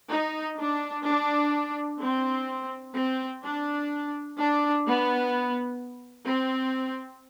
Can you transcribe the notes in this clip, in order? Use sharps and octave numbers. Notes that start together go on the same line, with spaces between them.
D#4
D4
D4
C4
C4
D4
D4
B3
C4